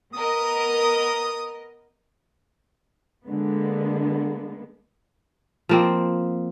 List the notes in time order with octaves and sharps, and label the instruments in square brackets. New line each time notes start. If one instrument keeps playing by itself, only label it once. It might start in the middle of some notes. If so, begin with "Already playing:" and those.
[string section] B3 A#4 D#5 [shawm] D#6
[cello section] D3 G#3 A#3 B3
[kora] F3 A#3 C4